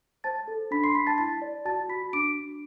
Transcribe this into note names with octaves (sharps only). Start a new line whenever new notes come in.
C5 A5 A6
A4
D4 B5 B6
C6 C7
D4 B5 B6
A5 A6
E4 A5 A6
D5
F#4 A5 A6
F#4 B5 B6
D4 D6 D7
D4